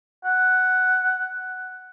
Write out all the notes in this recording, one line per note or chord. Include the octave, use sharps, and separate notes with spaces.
F#5